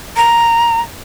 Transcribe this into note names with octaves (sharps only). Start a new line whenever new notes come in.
A#5